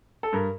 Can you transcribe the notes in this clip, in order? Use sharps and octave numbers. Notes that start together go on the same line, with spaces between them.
A4
G2 A#4